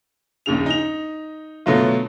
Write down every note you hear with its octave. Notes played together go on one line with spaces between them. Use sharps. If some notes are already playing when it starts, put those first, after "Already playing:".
A#1 D#2 C#3 F7
D#4 F7
B2 D3 F#3 A3 F4